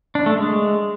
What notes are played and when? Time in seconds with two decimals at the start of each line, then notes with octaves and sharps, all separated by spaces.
0.15 D4
0.26 A3
0.37 G#3